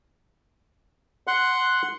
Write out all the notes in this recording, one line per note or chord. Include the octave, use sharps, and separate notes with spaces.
F#5 C6 F#6